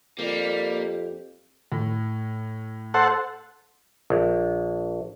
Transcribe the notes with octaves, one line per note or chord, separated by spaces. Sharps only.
F2 G3 A#3
A2
A4 C5 F#5
A#1